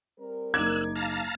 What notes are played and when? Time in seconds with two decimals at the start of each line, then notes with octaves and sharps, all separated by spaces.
0.19 G3 C4 A#4
0.54 F#1 D#4 D6 E6 F#6 G#6
0.96 F5 A5 A#5